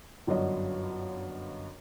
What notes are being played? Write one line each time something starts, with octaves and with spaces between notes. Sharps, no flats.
G1 F#2 D4 F#4 C#5 D#5